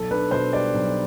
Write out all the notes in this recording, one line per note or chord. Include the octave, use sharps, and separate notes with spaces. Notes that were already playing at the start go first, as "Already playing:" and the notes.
Already playing: B1 A4
D4 B4
B2 C5
G3 D5
B1